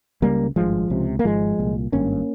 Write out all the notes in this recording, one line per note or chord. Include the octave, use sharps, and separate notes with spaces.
C#2 C#3 G3 A#3
G#1 G2 F3 G#3
C#2 C3
A#3
G#1 G#2 F3 G#3
C2 A#2
G#1 G2 A#3 C#4